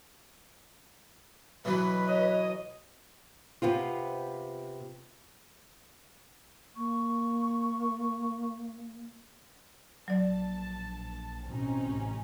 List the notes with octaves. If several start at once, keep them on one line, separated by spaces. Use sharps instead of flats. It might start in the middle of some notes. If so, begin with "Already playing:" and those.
B2 E3 F#3 B4
C#5 D#5
C3 B3 C4 F4
A#3 C#6
A#1 F#3 D5 A5
A1 B2 C4 C#4 D#4
A1 C3